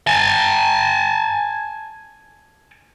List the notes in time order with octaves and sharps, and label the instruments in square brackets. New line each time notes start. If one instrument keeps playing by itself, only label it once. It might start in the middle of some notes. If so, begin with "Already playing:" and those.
[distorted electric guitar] G#5 A5